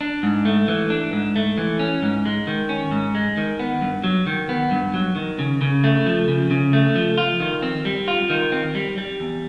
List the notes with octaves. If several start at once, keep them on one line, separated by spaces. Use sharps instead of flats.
D4
G#2
A3
E3
D4
G#2
A3
E3
C#4
G#2
G#3
D#3
C#4
G#2
G#3
D#3
B3
G2
F#3
D#3
B3
G2
F#3
D#3
C#3
C#3
A3
F3
C#3
C#3
A3
F3
F4
D#3
C4
G3
F4
D#3
C4
G3
G3
E2